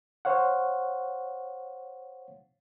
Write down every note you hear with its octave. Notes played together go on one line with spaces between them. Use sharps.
C5 C#5 F5 F#5